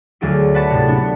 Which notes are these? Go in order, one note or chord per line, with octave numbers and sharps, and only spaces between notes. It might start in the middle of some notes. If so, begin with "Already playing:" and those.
D2 F#3 D4 G#4 D7
B4 D5 F#5 A5 C#6
A2 C3
B3 D4 F#5